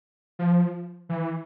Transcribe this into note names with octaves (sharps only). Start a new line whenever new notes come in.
F3
E3